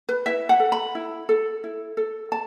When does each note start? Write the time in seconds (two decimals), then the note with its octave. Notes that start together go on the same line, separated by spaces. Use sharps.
0.09 B4
0.26 E4 E5
0.49 F#5
0.60 A4
0.72 B5
0.95 E4
1.29 A4
1.64 E4
1.97 A4
2.32 A5